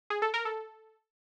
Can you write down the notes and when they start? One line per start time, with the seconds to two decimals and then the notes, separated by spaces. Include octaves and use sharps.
0.10 G#4
0.22 A4
0.34 A#4
0.45 A4